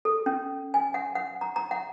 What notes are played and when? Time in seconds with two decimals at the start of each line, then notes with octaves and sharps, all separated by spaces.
0.05 A4
0.26 C#4
0.74 G#5
0.94 F#5
1.15 F#5
1.41 A#5
1.56 A#5
1.71 F#5